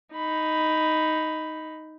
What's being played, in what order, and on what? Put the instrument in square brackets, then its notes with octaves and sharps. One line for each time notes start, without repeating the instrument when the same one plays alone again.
[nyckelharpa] D#4 B5